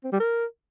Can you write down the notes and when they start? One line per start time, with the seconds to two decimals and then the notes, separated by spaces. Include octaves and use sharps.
0.04 C4
0.12 G3
0.20 A#4